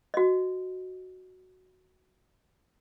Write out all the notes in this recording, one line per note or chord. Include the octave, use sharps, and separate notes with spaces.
F#4 D#5